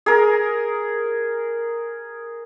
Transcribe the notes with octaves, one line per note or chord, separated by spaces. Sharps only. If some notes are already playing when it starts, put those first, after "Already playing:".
G#4 A#4